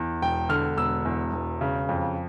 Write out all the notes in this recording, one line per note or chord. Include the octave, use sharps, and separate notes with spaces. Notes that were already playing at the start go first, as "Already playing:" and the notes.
Already playing: E2
E1 G5
D3 F6
E1 E6
E2
E1
C#3
F2